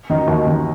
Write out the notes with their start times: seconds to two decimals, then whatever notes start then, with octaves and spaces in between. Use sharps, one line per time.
0.10 D#3 D#4
0.28 D#2 D#5
0.47 D#3